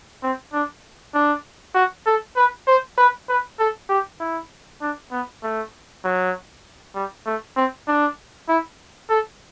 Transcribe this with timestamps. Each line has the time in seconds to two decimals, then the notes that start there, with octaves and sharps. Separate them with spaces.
0.23 C4
0.53 D4
1.14 D4
1.75 F#4
2.06 A4
2.36 B4
2.67 C5
2.98 B4
3.29 B4
3.59 A4
3.89 G4
4.20 E4
4.82 D4
5.11 B3
5.43 A3
6.04 F#3
6.95 G3
7.26 A3
7.56 C4
7.88 D4
8.48 E4
9.10 A4